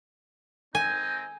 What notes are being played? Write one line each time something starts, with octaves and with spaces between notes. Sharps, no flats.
C4 D#4 G#5